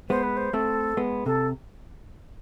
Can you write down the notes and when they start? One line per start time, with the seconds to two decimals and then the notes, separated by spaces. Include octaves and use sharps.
0.09 G#3 B3 C5
0.23 B4
0.37 C5
0.53 A3 C4 A4
0.97 G#3 B3
1.26 C3 A4